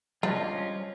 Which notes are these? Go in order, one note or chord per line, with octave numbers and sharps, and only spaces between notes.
G3 C#4 D4 F4 C5 D#5